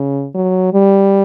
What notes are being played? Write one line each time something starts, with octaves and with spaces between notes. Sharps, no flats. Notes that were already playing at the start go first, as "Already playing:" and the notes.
Already playing: C#3
F#3
G3